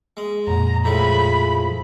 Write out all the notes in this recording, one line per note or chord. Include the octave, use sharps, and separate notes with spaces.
G#3
F2 A#2 A#5
A2 F3 G#3 B5